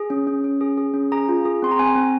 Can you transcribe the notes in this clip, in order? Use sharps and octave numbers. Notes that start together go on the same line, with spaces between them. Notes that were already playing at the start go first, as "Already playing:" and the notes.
Already playing: G#4
C#4
C#4
C#4
G#4
G#4
C#4
G#4 A#5
F4
G#4
C4 C6
A#5
C4 G#5
C4